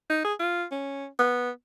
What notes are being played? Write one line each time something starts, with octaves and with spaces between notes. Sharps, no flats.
D#4
G#4
F4
C#4
B3